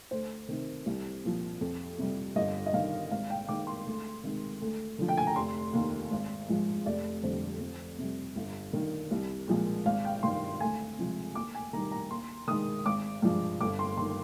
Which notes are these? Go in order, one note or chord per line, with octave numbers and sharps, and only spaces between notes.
D2 C5
C3 D#3
C2
A#2 F3
F2
C3 G3
G1 D#5
D#5
G2 D#3 F5
G#1 F5
G5
G#2 D#3 D6
C6
D2
C3 D#3 G#3
D2
D3 F3
G5
G#5
A#5
F1 C6
D#2 D#3
G#1
G#2 F3 G#3
F1 D5
F2 D3 G3 C5
F2
C3 G3
G1
G2 D#3
C2
A#2 F3 G#3
G#1 F5
G5
G2 D#3 C6
D2 G#5
C3 F3 G#3
D#2 D6
G#5
D#3 G3 A#5
A#5
D#2 C6
D#3 G#3 D#6
G#1 D6
G2 F3 G#3
G1 D6
C6
D#3 C6